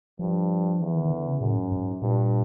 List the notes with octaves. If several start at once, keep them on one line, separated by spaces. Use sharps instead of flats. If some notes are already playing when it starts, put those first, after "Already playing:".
G2 F3
E2 E3
D#3
D#3
D3
C#3
F#2 A2
G#2
G#2
G2 A#2